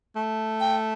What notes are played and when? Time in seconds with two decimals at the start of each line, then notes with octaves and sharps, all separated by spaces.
0.16 A3
0.60 G5